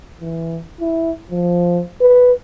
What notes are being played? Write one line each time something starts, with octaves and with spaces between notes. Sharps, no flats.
E3
E4
F3
B4